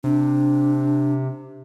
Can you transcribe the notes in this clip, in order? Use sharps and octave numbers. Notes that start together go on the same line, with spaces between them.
C3 D4